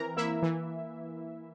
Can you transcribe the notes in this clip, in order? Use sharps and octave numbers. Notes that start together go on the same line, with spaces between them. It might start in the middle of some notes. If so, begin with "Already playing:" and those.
Already playing: E3 C4 A#4 A#5
A#3 E4 E5
E3